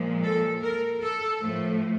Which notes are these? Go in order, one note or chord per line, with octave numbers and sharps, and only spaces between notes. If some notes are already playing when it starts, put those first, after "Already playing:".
Already playing: A#2 F3 G#3
A4
A#4
A4
A2 F3 A3